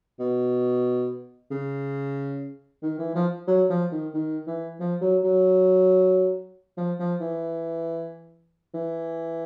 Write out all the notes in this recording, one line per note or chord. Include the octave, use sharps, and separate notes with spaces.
B2
C#3
D#3
E3
F3
F#3
F3
D#3
D#3
E3
F3
F#3
F#3
F3
F3
E3
E3